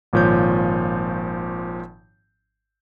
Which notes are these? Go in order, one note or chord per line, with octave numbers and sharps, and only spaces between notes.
G#1 A#2 F3 C#5 G6